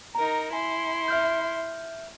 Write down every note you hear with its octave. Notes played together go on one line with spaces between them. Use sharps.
D#4 A#4 A#5
E4 G#5 C6
E5 F6 G6